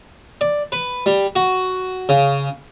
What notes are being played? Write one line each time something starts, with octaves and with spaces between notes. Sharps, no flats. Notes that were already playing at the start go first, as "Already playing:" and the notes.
D5
B4
G3
F#4
C#3